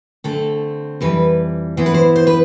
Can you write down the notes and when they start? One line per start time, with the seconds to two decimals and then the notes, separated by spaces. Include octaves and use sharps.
0.24 D3 A3 C4 A4
1.01 F2 E3 G3 B4
1.77 E3 B3 E4 C5
1.86 B4
1.94 C5
2.16 C5
2.27 B4